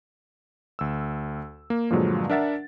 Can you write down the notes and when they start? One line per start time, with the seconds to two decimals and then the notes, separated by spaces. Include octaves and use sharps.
0.79 D2 E6
1.70 A#3
1.90 G2 A#2 D3 F3 F#3 G#3
2.30 D4 A#4 E5 F#5 A6